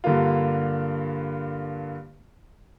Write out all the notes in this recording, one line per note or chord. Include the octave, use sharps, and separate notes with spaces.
G2 D3 A#3 F4